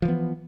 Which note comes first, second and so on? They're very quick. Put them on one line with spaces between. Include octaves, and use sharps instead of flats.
F3 E3 B3